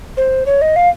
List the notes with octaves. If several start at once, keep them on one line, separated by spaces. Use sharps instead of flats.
C5
C#5
D#5
F5